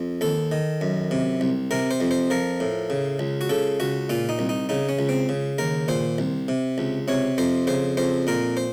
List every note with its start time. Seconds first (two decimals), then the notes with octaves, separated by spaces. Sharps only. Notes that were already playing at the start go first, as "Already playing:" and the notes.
Already playing: F2
0.21 D#2 A4
0.52 D#3
0.81 F#2
1.11 C3
1.41 C2
1.71 C3 A#4
1.91 C5
2.00 F2
2.11 C5
2.30 F3 A#4
2.60 A2
2.90 C#3
3.19 C#2
3.41 F#4
3.49 C#3 A4
3.80 C#2 F#4
4.09 A#2 F4
4.29 D#4
4.39 C2
4.49 D#4
4.69 C#3 D#4
4.89 C#4
4.99 C#2
5.09 C4
5.29 C#3
5.58 D#2 A#4
5.88 A#2 C5
6.18 C2
6.48 C3
6.78 C#2
7.08 C3 C#5
7.38 F2 C5
7.67 C#3 C5
7.97 F2 C5
8.27 A#2 A#4
8.57 C5